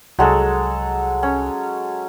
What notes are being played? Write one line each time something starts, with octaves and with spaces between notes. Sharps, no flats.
C2 F#3 G#3 A4
C#4